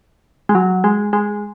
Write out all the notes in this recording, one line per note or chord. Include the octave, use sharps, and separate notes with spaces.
G#3
F#3
G#3
G#3